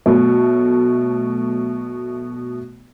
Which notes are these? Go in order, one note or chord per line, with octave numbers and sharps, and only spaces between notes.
B2 F#3 A3